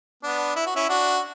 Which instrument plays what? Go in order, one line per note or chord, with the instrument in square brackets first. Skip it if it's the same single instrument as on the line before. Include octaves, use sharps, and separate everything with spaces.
[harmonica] B3 D4
E4
F#4
C#4 E4
D4 F#4